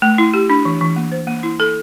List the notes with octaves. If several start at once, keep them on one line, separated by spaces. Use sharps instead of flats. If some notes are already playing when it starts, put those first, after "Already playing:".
A3
E4
G4
D4
E3
E3
A#3
C5
A#3
E4
A4